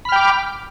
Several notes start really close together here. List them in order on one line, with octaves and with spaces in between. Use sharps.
B5 F6 G5 D6